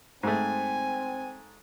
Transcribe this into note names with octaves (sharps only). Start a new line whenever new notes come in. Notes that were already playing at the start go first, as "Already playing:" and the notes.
G#2 A3 C4 G#5